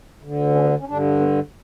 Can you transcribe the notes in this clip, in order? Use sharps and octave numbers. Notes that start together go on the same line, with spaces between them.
D2 D3
C#4
B3
C#4
G2 D3 D4
B3